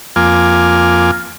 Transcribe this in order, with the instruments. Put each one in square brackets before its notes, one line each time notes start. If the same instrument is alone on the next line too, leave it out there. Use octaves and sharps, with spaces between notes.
[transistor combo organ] F2 A#3 F4 G#5 D6 F6